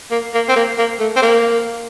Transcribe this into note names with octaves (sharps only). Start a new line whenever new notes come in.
A#3
A#3
C4
A#3
A#3
A3
C4
A#3